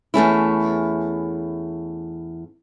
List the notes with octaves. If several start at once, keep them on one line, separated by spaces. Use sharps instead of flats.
E2 A3 C#4 E4